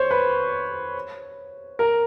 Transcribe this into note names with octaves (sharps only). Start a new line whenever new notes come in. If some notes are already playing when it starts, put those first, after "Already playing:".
Already playing: C5 C#5
B4
A#4